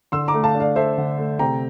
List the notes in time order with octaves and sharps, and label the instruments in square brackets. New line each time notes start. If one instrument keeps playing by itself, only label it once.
[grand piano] D3 [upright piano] C6 E6
[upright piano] A#5 D6
[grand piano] A3
[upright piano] F5 A5
[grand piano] D4
[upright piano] D5 F5
[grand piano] A4 [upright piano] C5 E5
[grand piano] D3
A3
[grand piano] C3 [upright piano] G5 A#5